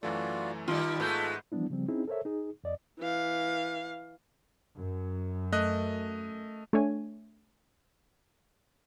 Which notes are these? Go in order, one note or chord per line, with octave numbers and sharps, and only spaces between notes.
F#2 E3 A3 F4 F#4 D5
D#3 G3 F4 A5 B5 D#6
G#2 G#3 A3 B3 G6
E3 F3 G3 B3 D4 E4
C#3 F3 G3 C4
C4 C#4 D#4 E4 G#4
A4 A#4 C5 C#5 E5
D#4 G#4
F2 D5 D#5
E3 F5
F#2
A3 D#5 F#6
A3 D4 C#5 G#5